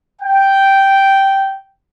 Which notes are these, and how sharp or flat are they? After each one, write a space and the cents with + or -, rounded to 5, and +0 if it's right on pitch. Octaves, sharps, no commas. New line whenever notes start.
G5 -5